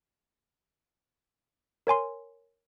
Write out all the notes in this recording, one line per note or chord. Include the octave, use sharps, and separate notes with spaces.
A#4 C#5 G#5 C6